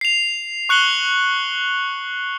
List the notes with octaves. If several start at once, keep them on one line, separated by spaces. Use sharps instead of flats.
C7 F7
C#6 F#6 C#7 F#7 G7